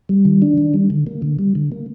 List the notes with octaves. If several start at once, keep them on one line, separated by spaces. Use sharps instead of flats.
G3
D#3
D4
D#3
G3
D3
A#3
D3
G3
D3
A#3